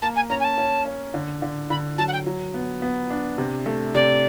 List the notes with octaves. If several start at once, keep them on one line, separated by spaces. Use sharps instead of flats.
A#3 A5
G#5
C#4 A#5
G#5
A5
C#4
C#4
D3
D3
D3 B5
F#3 A5
F#5
G5
F#3
B3
B3
D4
C3
A3
C3 D5